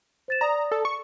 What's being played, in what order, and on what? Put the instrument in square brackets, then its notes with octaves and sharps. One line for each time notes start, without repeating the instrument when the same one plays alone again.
[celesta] C5 A6 E7
[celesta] D5 D#6 [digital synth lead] A#5
[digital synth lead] A4
C#6